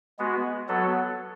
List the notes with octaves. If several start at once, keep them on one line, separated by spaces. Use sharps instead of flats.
G#3 B3 F#4
F#3 B3 F#4 A4